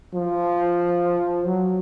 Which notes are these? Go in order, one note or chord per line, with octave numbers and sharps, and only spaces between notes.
F3
F#3